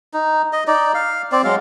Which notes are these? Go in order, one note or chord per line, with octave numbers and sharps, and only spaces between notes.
D#4
D#5
D#4 D5
F5
C4 D5
F#3 G#3 F5